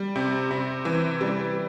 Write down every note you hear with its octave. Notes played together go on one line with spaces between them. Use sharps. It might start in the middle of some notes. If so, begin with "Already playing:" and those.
Already playing: G3
C3
C3
E3
G3